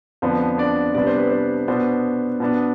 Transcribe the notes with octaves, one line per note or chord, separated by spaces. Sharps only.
F2 D3 F3 B3 C5
D4 D5
C3 G3 B3 D4 D5
C5
B4
C5
B2 B3 D4 C5
B2 B3 D4